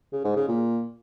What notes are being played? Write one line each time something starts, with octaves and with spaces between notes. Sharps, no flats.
C#3
G#2
C#3
A#2